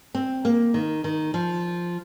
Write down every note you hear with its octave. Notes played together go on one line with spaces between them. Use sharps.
C4
A#3
D#3
D#3
F3